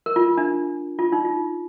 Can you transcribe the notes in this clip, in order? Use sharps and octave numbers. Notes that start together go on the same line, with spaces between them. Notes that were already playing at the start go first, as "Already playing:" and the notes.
A#4
F4
D4
F4
D#4
F4